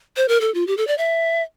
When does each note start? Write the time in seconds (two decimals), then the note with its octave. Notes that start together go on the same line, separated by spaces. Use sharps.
0.17 C5
0.28 A#4
0.41 A4
0.54 F4
0.67 G4
0.77 A4
0.87 D5
0.98 E5